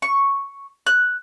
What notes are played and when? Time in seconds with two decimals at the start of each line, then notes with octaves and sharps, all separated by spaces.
0.02 C#6
0.87 F#6